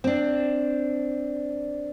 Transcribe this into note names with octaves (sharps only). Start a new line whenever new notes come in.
C4 D4